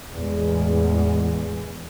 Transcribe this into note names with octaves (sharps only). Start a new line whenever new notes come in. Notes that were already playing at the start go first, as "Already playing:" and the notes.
E2 A2 G#3